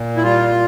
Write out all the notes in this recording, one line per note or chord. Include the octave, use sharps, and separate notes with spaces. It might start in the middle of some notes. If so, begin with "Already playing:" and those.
Already playing: A#2
E4
G3 F4